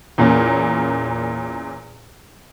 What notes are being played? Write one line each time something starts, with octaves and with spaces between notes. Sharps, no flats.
E2 A#2 A#3 C#4